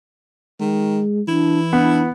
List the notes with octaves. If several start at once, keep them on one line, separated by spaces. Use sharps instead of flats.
D#3 G#3
E3 D4 E4
B3 D4